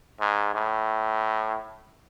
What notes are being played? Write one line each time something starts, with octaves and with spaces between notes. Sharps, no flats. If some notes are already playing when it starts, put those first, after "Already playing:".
G#2
A2